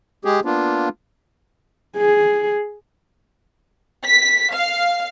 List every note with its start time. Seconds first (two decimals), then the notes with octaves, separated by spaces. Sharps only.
0.25 G#3 G4 G#4
0.45 A#3 B3 D4 F4
1.97 G#4
4.07 B6
4.54 F5